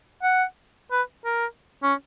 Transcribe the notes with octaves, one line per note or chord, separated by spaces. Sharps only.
F#5
B4
A#4
C#4